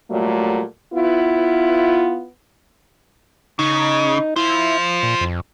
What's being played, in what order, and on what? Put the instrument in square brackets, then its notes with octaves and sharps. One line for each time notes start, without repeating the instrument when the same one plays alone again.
[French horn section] A#2 F#3 G3 A3
B3 E4 F4
[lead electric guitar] C#3 [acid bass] D#4
[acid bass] E4 [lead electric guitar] F4 C5
[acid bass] A#2
F2